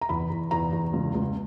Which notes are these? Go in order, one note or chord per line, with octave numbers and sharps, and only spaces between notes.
A#5
E2 B5
E2
E2 A#5
E2
C#2
C#2